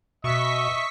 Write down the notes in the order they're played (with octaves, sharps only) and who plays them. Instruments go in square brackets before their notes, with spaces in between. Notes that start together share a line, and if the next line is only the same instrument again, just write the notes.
[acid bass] B2 [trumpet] D#5 [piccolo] E5 [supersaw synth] C#6 B6